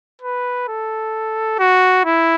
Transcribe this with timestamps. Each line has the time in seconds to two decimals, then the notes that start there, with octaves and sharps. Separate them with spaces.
0.22 B4
0.68 A4
1.59 F#4
2.05 E4